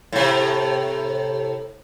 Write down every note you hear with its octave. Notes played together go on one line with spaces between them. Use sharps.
A2 C3